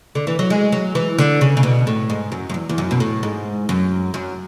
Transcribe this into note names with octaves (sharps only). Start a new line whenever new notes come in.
D3
E3
F#3
G#3
F#3
E3
D3
C#3
C#3
B2
A2
G#2
F#2
F#2
E2
E2
F#2
B2
A2
G#2
F#2
F#2